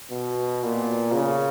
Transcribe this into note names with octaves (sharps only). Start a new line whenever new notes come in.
B2
A#2
C#3